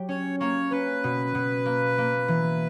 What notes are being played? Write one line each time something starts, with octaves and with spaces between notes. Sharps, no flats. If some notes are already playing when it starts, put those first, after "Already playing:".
Already playing: F#3 G4
C#4 C#5
A#3 C#5
C#4 B4
B2
B2
A#3
A#3
E3